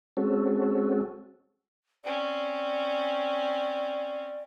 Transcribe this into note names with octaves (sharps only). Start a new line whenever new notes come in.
G#3 C4 C#4 F#4 A4
C4 C#4 D5